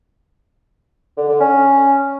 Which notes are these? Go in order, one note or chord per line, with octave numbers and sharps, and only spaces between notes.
D3
D3
C#4